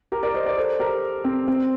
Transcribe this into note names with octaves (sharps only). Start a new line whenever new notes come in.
G4 A#4
A#4 D5
C5 D#5
A#4 D5
A4 C5
G4 A#4
C4
C4